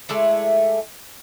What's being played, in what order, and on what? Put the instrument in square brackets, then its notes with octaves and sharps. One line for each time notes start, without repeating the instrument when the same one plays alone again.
[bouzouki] G#3 A3 E4 D5